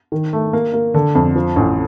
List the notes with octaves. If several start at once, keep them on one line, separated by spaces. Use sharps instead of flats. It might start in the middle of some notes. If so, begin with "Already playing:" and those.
D#3
A3
A#3
A#3
D3
F2
F3
A1